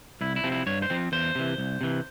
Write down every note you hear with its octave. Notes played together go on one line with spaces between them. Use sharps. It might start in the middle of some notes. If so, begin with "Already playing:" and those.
C2 E4
E4
C3 F3 C4
E4
G2 C#5
C5
F3 C4
E2 C5
C3 E3
C2
C3 E3